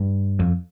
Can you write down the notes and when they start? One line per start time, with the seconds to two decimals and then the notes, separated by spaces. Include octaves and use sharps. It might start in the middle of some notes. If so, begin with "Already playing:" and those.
Already playing: G2
0.40 F2